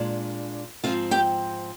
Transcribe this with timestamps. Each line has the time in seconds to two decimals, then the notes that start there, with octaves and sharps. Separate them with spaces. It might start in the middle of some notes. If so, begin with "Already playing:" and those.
Already playing: A#2 G#3 D4
0.84 G#2 F3 C4 F4 F5
1.11 G4 G5